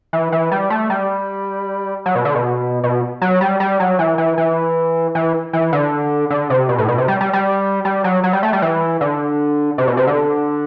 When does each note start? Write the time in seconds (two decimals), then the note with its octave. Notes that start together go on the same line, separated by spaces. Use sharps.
0.13 E3
0.32 E3
0.52 G3
0.70 A3
0.90 G3
2.06 F#3
2.15 B2
2.25 D3
2.35 B2
2.84 B2
3.21 F#3
3.41 G3
3.60 G3
3.80 F#3
3.99 E3
4.18 E3
4.38 E3
5.15 E3
5.53 E3
5.73 D3
6.30 D3
6.50 C3
6.69 B2
6.78 A2
6.88 B2
6.98 C3
7.08 G3
7.21 G3
7.33 G3
7.85 G3
8.04 F#3
8.24 F#3
8.33 G3
8.43 A3
8.53 G3
8.62 E3
9.01 D3
9.78 C3
9.87 B2
9.97 C3
10.07 D3